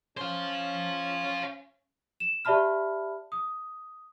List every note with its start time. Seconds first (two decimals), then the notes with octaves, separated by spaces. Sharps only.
0.17 C#4 C5 F5
2.20 E7
2.45 G4 D5 E5 A5 B5 F6
3.32 D#6